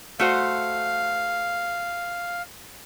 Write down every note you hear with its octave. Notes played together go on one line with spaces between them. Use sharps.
A3 F#4 C5 F5